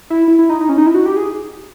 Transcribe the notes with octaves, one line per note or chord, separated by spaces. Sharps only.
E4
E4
E4
D#4
D#4
C#4
D#4
E4
F#4
G4
G#4